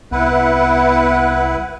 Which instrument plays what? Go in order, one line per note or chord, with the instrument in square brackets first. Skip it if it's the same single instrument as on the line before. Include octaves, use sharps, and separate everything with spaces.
[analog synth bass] C2 [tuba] B3 [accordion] E4 B4 [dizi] F#5